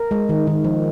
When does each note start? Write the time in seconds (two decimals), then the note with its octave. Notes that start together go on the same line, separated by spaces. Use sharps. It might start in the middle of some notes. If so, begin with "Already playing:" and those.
Already playing: A#4
0.11 G#3
0.29 D#3
0.47 D#3
0.64 F3